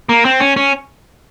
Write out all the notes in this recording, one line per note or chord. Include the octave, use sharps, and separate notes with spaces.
A#3
C4
C#4
C#4